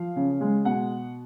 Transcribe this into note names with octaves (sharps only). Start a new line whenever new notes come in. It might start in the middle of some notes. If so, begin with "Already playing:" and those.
Already playing: F3 F5
C#3
G#3
B2 F#5